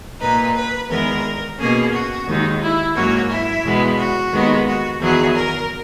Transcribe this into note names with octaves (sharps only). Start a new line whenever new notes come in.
A#2 A#3 D#4 B4
B4
E2 D#3 G#3 B3 A#4
B2 A#3 C#4 G#4
F#4
D#2 D#3 G#3 D#4
E4
G#2 F#3 A#3 C#4 F#4
E4
E2 B2 G#3 B3
F#4
D#2 D#3 G#3 B3
F#4
E2 D#3 F#3 B3 G#4
A#4